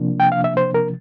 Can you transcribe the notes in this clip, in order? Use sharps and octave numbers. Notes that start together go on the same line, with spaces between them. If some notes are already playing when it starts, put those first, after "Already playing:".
Already playing: C3 F3 A#3 D4
G5
F5
E5
C5
A#4